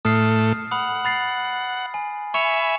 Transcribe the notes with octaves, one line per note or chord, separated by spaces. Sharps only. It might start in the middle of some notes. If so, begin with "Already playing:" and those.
A2 A3 D#6 F6 C7
F#5 B5 D#6
B5 A6 C7
G#5
E5 G#5 B5 C#6 C#7 F7